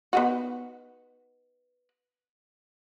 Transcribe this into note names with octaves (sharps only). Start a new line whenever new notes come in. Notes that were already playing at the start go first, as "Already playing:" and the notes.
B3 D#4 F#4